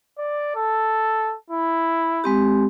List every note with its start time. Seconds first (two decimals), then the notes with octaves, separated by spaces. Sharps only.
0.18 D5
0.55 A4
1.50 E4
2.24 G#3 C4 G4